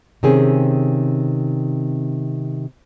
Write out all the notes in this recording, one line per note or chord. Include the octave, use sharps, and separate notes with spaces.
C3 D#3 C4 C#4 G#4